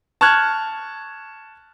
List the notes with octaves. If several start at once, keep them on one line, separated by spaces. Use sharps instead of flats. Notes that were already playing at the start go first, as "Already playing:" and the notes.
A5 C#6 F6 F#6 G#6